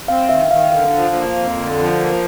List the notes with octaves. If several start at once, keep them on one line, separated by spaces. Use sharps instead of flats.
C4 F5
D#3 E5
D#3 F5
D3 F5
F3
A#3
F2
D3
F3
A#3